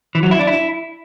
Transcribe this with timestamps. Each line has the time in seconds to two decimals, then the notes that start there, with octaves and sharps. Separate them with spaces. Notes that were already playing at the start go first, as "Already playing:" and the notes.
0.15 E3
0.23 F#3
0.31 E4
0.39 D4
0.47 E4